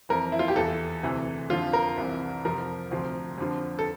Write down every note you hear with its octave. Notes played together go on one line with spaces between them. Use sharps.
F2 E3 A#4
E4
F4
G4
E2 E3 A4
D2 C3 E3
F2 D3 F3 F4
A#4
C2 C3 E3
F2 C3 F3 A#4
D2 C3 F3
F2 D3 F3
A4